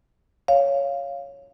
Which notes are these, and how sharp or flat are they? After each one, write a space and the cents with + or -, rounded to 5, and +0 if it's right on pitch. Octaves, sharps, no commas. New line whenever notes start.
C#5 +5 F5 -5